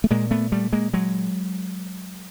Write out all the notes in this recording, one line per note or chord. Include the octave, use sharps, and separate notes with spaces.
A3
A#2 G#3 A#3
A3 B3
G3 A3
G#3 A#3
F#3 G#3